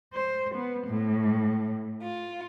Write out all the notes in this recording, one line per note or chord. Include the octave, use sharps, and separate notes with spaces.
C5
B3
A2
F4